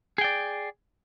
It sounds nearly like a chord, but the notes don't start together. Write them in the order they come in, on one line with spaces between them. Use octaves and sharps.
G#4 G5 D5